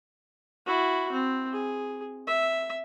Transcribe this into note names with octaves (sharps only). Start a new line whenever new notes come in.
E4 F#4
C4
G#4
E5